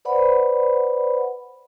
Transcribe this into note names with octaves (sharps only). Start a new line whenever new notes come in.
B4 C5 D5 F#5 B5